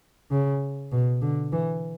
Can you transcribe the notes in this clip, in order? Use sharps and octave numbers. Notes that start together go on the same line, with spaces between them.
C#3
B2
D3
E3